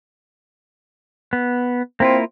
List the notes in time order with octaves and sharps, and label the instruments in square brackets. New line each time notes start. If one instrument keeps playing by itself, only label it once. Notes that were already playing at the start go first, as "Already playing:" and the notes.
[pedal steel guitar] B3
[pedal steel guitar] A#3 E4 F4 [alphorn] C4